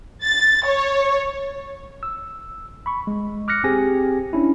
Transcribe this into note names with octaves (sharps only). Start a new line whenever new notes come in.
A6
C#5
E6
B5 C#6
G#3
D6 F6 F#6 A#6 C#7
C4 G4 G#4 G#5 A#6
C#4 D4 E4